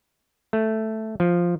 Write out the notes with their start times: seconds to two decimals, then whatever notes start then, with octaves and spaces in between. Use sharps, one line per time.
0.53 A3
1.20 F3